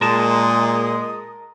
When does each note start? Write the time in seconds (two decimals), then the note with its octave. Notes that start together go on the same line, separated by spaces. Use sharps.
0.01 A#2 G#3 A#4 A5 D#6